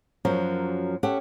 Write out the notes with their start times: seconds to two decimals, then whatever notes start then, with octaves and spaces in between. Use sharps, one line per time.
0.25 F#2 F3 F#3 C#4 A#4
1.03 C#4 G4 A4 F#5